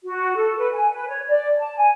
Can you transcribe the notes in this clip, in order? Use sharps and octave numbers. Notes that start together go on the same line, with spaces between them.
F#4
A4
B4
G#5
B4
C#5
D5
A5
G#5